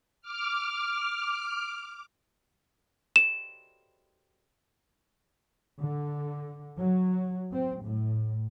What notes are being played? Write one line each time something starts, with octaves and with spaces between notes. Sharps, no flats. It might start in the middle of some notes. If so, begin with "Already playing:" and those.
D6 F6
E7
D3
F#3
C4
A2